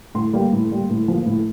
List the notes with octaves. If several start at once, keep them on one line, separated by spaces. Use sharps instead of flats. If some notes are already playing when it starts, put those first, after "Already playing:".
A2 C6
G3 A#3
A2
G3 A#3
A2
F3 A#3
A2